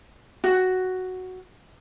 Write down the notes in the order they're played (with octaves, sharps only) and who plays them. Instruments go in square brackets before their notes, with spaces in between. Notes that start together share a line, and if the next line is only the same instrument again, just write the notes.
[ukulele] F#4